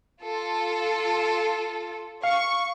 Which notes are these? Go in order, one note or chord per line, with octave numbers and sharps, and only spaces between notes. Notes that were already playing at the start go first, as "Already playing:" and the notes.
F4 A4
F5 C#6